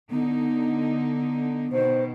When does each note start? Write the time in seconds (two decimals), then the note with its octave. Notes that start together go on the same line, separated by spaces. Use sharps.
0.10 D3 B3 D#4
1.72 B2 D#3 C5